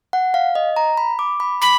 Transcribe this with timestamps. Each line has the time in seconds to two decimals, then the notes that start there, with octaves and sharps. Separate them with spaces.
0.13 F#5
0.34 F5
0.55 D#5
0.76 A#5
0.97 B5
1.19 D6
1.40 B5
1.61 B5 D6